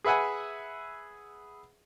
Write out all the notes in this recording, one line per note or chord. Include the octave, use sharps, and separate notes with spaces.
G#4 B4 E5 F#5 G#5